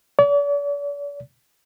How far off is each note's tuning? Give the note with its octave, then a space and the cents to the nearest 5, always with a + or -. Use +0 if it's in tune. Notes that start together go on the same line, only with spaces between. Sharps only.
D5 -45